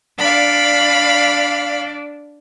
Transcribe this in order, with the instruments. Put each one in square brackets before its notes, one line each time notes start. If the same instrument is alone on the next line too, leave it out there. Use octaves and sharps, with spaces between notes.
[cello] D4 D5 [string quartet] F5 B5